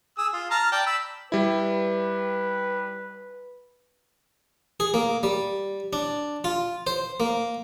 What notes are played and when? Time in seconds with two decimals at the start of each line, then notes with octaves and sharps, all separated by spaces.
0.18 G#4 D#6 E6
0.33 F4
0.50 A5 A#5 F6
0.72 D5 G5 A5
0.86 B5 E6
1.32 G3 E4 B4
4.80 G#4
4.94 A#3
5.23 G3
5.93 D4
6.44 F4
6.87 C5
7.20 A#3